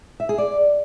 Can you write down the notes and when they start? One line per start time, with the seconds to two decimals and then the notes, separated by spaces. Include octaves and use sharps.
0.20 E5
0.29 G#4
0.38 D5